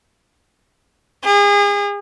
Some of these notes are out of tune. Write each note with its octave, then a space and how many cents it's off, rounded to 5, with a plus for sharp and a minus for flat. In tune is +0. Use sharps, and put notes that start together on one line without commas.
G#4 -35